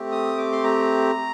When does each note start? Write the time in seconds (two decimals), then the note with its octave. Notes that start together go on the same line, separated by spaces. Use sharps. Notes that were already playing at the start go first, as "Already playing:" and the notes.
Already playing: A3 C4 G4
0.12 D#6
0.38 D6
0.52 C6
0.64 A#5